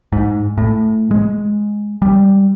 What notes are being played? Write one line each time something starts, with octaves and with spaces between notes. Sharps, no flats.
G#2
A2
G#3
G3